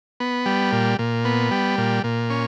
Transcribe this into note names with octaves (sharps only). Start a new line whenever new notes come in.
B3
G3
A#2
A#2
B3
G3
A#2
A#2
C#4